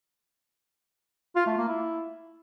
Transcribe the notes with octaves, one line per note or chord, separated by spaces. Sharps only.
F4
A3
A#3
E4